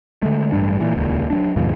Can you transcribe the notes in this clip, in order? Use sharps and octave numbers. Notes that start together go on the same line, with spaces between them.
D3 G#3 A3
A1 G2 G3 D4
A#2 E3
D#1 C#2 A#2
F#3 A3 D4
D#2 G#2 B2 F3